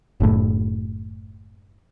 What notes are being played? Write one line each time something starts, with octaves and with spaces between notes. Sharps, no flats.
F#1 A2